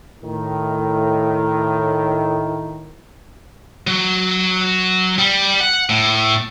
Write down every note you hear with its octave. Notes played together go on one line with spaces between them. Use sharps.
A2 D#3
F#3
G3
F#5
A2